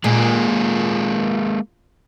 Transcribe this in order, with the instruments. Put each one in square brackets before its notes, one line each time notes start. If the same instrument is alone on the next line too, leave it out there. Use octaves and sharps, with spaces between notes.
[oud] A#2 [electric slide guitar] G#3 A#3 G#4